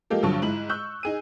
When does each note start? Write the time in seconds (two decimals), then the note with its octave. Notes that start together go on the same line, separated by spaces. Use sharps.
0.10 F3 G#3 A#3 G4 A4
0.23 A#1 G2 D3 F#3 A5 C#6
0.42 G#2 E4 F#7
0.69 C#6 E6 F#6 G6
1.03 D#4 G#4 D#7